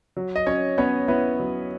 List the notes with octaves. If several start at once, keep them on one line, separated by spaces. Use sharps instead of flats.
F#3
D#5
F#3 C#4 C#5
B3 C#4 C#5
B3 E4 B4
F#3